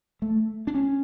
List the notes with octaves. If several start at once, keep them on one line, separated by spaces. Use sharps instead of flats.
A3
D4
C#4